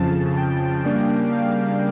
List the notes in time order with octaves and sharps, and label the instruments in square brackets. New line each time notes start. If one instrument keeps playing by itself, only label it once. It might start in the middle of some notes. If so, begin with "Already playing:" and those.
Already playing: [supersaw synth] F2 C#3 F3 A5
G5
C#3 G3 A#3 D4
F5